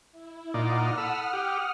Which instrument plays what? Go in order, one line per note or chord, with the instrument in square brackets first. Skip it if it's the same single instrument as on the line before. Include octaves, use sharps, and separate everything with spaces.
[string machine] E4
[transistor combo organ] A#2 D#4 D5 [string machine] F#5 D#6 F6
[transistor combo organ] A4 B5 E6
G4